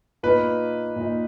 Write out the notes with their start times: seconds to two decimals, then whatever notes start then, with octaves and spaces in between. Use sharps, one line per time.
0.23 A#2 A#3 D#4 B4
0.96 A#2 A#3 D#4